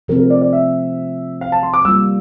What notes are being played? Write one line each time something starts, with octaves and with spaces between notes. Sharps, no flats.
C3 F3 A3 C4 A#4
A#4
D5
D5
E5
F5
A5
C6
D6
G3 A#3 F4 E6